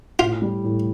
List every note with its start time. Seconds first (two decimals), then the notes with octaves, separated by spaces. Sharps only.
0.19 A2 F4
0.42 G3
0.64 A2